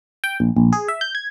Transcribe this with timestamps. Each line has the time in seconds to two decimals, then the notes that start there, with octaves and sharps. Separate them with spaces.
0.24 G5
0.40 A#1
0.57 A#1
0.73 G#4
0.88 E5
1.01 G6
1.15 G#6